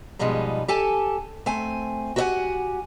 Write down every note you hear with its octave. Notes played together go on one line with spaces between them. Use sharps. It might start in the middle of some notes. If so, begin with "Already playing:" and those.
G#2 B2 F3 G3 G#3 D#4
G4 A4 G#5 A5
A3 C4 G#5
F#4 G4 A#4 E5 F#5 G#5